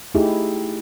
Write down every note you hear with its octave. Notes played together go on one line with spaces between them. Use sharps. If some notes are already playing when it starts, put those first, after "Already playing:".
A3 D#4 E4 G4 G#4